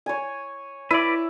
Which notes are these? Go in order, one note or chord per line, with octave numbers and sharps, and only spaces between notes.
C#5 G#5
E4 B4 D5